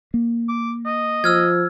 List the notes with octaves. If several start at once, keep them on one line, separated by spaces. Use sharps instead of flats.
A#3
D6
D#5
F3 E6 F6 G#6